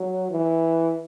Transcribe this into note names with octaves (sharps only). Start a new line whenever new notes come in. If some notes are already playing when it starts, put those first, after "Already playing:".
Already playing: F#3
E3